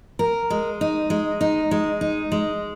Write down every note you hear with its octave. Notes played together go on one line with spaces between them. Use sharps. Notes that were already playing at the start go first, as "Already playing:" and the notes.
A#4
G#3
D#4
G#3
D#4
G#3
D#4
G#3